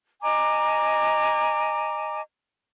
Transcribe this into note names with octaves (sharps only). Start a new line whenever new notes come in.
D#5 G#5 A#5 D6